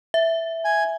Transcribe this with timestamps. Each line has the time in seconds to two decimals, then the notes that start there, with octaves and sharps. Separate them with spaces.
0.14 E5
0.65 G#5